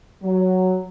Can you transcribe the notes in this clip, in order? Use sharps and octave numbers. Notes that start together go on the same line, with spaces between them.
F#3